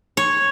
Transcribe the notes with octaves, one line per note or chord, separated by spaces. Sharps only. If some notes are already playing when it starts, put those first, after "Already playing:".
C#5